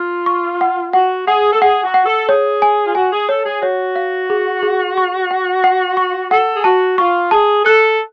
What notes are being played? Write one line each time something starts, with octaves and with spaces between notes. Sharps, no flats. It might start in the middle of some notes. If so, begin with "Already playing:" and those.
Already playing: F4 F6
C#6
F#5
F#4 F#5
G#4 F#5
A4
G#4 F#5
F#4
F#5
A4
G#4 C#5
G#5
F4
F#4 G#5
G#4
A4 C#5
G#4
F#4 C#5
F5
G#4
G#4
C#6
F#5
F#5
C#6
A4 F#5
G#4
F#4 A5
F4 C#6
G#4 A5
A4 F#6